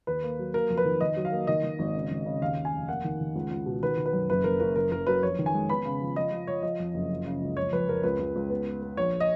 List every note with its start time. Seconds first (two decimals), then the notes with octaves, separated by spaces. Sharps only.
0.07 D#2 B4
0.24 A#3
0.39 F#3
0.54 A#3 A#4
0.70 F2
0.77 B4
0.85 D#3
1.01 D#3 D#5
1.17 F#3
1.25 F5
1.32 A#3
1.47 D#3 D#5
1.63 D#3
1.79 G#1
1.94 C#3
2.10 G#1
2.26 C#3
2.41 D#2 F5
2.57 C#3
2.65 G#5
2.73 F1
2.88 A#3 F#5
3.04 D#3
3.20 D#3
3.36 C#2
3.51 C#2
3.66 B2
3.83 D#3 B4
3.97 D#3
4.06 B4
4.13 F#2
4.30 F#1 B4
4.44 F#1 A#4
4.60 F#1 A#4
4.76 F#1 A#4
4.91 F#1 A#4
5.07 F#3 B4
5.23 F2 C#5
5.39 D#3
5.46 G#5
5.54 G#3
5.69 B3 B5
5.86 C#3
6.01 F3
6.16 F3 D#5
6.32 F3
6.47 F3 C#5
6.63 F3 D#5
6.80 F2
6.94 F#1
7.10 F3
7.26 C#3
7.42 C#2
7.57 F2 C#5
7.73 F2 B4
7.89 F2 A#4
8.03 C#2 B4
8.19 C#2
8.36 C#2
8.50 B3
8.66 B3
8.82 B3
8.97 A#1 C#5
9.20 D#5